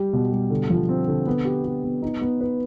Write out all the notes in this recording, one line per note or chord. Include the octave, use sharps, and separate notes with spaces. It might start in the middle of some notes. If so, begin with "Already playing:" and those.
Already playing: G3 G4
B2
G3
D3
F3
C4
D3
B3
G4
G4
B3
D#4
B3
B4